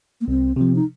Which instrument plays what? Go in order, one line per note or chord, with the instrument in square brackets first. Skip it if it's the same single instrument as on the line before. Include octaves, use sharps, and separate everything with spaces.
[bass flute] A#3
[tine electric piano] C2 [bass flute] C4
[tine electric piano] C3 F3 [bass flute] C4
[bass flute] D#4